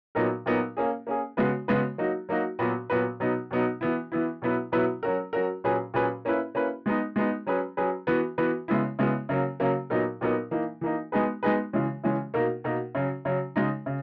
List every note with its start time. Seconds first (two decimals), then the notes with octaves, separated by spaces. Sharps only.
0.15 A#2 F#3 B3 D#4 A#4
0.46 A#2 F#3 B3 D#4 A#4
0.77 A#3 C#4 G#4
1.07 A#3 C#4 G#4
1.37 C#3 G#3 B3 F#4 B4
1.68 C#3 G#3 B3 F#4 B4
1.98 F#3 A#3 D#4 F#4
2.29 F#3 A#3 D#4 F#4
2.59 A#2 F#3 B3 F#4 B4
2.90 A#2 F#3 B3 F#4 B4
3.20 B2 F#3 B3 D#4
3.51 B2 F#3 B3 D#4
3.81 E3 B3 E4
4.12 E3 B3 E4
4.42 B2 F#3 B3 E4 B4
4.72 B2 F#3 B3 E4 B4
5.03 F#3 C#4 F#4 A#4
5.33 F#3 C#4 F#4 A#4
5.64 A#2 F#3 C#4 G#4 B4
5.94 A#2 F#3 C#4 G#4 B4
6.25 A#3 C#4 E4 B4
6.55 A#3 C#4 E4 B4
6.86 G#3 B3 D#4
7.16 G#3 B3 D#4
7.47 F#3 C#4 G#4 B4
7.77 F#3 C#4 G#4 B4
8.07 E3 B3 F#4 B4
8.38 E3 B3 F#4 B4
8.68 C#3 G#3 B3 E4
8.99 C#3 G#3 B3 E4
9.29 C#3 F#3 A#3 C#4
9.60 C#3 F#3 A#3 C#4
9.90 A#2 F#3 B3 D#4 A#4
10.21 A#2 F#3 B3 D#4 A#4
10.51 E3 A#3 D#4
10.81 E3 A#3 D#4
11.12 G#3 B3 D#4 G#4 B4
11.43 G#3 B3 D#4 G#4 B4
11.73 C#3 E3 G#3 C#4
12.04 C#3 E3 G#3 C#4
12.34 B2 A#3 D#4 A#4
12.64 B2 A#3 D#4 A#4
12.95 C#3 F#3 C#4
13.25 C#3 F#3 C#4
13.56 C#3 G#3 D#4
13.86 C#3